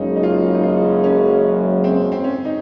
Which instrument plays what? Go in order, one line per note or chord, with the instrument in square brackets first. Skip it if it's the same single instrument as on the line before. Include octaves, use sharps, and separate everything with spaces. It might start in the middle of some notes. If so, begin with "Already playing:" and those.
Already playing: [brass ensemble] F#1 F#2 C#3 G#3 [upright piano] D#4
[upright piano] D#4
F4
D#4
F4
C#4
C4
C4
C#4
D#4